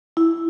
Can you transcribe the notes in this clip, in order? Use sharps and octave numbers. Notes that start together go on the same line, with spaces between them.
E4